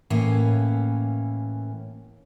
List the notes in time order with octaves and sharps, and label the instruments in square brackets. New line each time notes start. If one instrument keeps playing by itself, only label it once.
[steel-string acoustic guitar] A2 E3 A#3 C#4